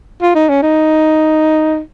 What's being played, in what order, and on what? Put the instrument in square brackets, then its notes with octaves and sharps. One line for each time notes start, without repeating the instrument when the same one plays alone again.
[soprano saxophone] F4
D#4
C#4
D#4